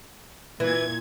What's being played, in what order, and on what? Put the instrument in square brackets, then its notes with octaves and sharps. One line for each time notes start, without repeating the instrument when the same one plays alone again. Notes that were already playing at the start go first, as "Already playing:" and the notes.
[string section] A#2 G#6 [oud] E3